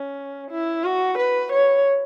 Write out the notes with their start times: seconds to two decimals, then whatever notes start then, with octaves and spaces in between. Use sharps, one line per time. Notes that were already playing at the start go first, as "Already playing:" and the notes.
Already playing: C#4
0.51 E4
0.84 F#4
1.18 B4
1.52 C#5